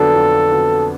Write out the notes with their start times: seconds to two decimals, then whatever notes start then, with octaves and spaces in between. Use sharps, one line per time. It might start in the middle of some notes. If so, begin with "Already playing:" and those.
Already playing: F2 D3 F#3 B3 D4 A4
0.15 F2
0.51 D3 F#3 B3 D4